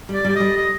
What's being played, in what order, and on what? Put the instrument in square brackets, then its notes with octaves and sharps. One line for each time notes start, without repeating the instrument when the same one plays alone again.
[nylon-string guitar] G3 [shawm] D5
[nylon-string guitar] G3 [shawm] D5
[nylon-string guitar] G3 [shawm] D#5
[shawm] D#5